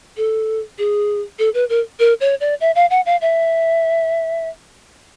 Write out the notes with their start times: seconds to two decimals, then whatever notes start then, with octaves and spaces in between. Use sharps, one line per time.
0.17 A4
0.78 G#4
1.39 A4
1.54 B4
1.70 A#4
2.00 A#4
2.21 C#5
2.40 D5
2.61 E5
2.75 F5
2.90 F#5
3.06 F5
3.21 E5